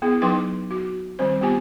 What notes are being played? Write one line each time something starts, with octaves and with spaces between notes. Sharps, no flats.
B3 E4 G#4
F#3 D#4 B4 G5 C6 D6
F#4
D#3 G3 C4 C5
B3 F4 G4 G#5